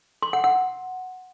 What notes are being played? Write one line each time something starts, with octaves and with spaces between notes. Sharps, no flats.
C6
F#5
F#5